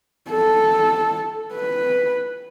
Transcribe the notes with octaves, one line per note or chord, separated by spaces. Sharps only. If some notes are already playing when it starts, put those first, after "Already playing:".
A4
B4